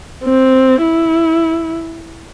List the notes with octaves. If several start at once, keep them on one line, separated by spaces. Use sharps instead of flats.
C4
E4